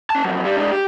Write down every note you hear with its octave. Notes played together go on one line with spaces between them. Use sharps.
C#4 A5
F2 F#3
G2 G3
G#3 D4
G4